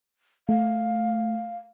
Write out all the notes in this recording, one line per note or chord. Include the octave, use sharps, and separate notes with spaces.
A3 F5